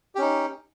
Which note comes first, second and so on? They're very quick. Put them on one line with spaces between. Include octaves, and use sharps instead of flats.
G4 C#4 D#4